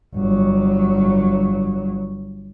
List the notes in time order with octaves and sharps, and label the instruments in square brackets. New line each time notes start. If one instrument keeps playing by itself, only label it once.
[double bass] G1 F#3